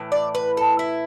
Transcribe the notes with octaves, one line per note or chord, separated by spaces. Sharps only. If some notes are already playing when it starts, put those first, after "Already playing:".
Already playing: A2 E3
D5
B4
A4
E4